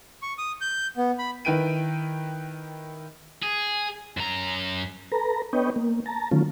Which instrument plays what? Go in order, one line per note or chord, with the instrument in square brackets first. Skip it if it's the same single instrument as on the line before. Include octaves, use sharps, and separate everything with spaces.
[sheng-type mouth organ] C#6
D#6
G6
B3
B5
[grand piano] D#3 E4 B4 G5 D7 D#7
[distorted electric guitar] G#4
F#2 A#5
[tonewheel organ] A4 B4 A#5
B3 D4 B4 C#5 D#5 G5
A#3
A5 A#5
D3 D#3 F#3 A3 C#4 F4